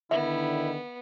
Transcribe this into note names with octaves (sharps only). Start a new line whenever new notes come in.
D3 D#3 B3 E4 E5